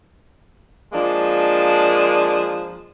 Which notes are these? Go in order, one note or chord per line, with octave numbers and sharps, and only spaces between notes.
F3 G#3 A#3 D4